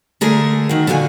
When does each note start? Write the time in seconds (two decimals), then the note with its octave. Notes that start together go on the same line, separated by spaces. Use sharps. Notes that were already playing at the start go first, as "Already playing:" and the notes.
0.21 D3 A3 G#4 A#4
0.69 D#3 F#4
0.87 D3 F3 F#4 D5 G#5